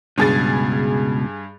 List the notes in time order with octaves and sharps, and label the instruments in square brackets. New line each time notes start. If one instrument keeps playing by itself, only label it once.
[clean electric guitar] C#2 B2 [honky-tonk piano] G2 G#4 A6